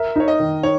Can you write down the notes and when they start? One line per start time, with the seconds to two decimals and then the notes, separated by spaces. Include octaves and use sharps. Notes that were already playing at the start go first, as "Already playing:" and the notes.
Already playing: A#4 E5
0.16 D#4 C#5
0.28 D#5
0.40 D#3
0.63 D#4 C#5